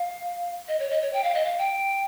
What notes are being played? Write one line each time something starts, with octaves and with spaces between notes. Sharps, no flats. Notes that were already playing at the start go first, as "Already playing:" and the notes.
Already playing: F5
D#5
C#5
D#5
C#5
G5
F5
D#5
F5
G5